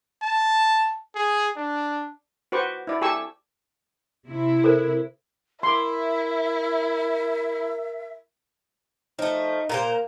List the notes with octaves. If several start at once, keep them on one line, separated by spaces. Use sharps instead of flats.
A5
G#4
D4
F#4 B4 C5 C#6 D6
E4 D5
G4 A4 G#5 C#6 E6
C3 E4
A4 A#4 C5
E4 A#4 E5 C6 D6
F3 A3 D#4
A#2 A#3 A#4 C5